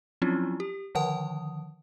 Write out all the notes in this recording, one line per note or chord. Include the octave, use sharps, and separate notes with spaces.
F3 F#3 C4 C#4 E4 F4
G4
D3 D#3 F3 F#5 A5 D#6